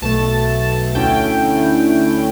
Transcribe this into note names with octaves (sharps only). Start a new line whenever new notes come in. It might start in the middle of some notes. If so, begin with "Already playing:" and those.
B1 B2 A3 A5
D2 D3 A3 C#4 E4 G5